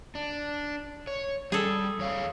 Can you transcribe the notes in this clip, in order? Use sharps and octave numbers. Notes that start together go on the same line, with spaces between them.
D4
C#5
G3 G#4 A4
E2 C#5 F5